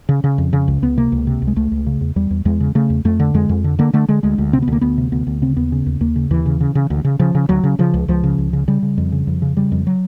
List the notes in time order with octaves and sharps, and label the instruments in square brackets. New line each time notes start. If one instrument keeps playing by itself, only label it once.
[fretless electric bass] C#3
C#3
F2
C#3
C#2
C#2 B3
C3 A#3
C#2
C3
C#2
G#3
C#2 A3
C#2
C#3
E2
E2 G3
E2
E2 G#3
C#3
C#3 A3
E2
F2 A3
D3
F2 G#3
F2
D3
D3 A#3
D3 A3
D3 G#3
D2 G#3
D2
C3 C4
B3
D2 A#3
D2 B3
C3
D2 B3
D2
C#3 C4
D#2 B3
C#3
D#2
D#2 A#3
C#3
D#2 E3
C#3
C#3
C#3
D2
C#3
C#3 F3
C#3
D2 F#3
C#3
C#3 F3
C#2
C#2 F3
C#3
C#2
C#3
C#3 G3
C#3
F2
C#3
F2
C#3
C#3 G3
F2
F#3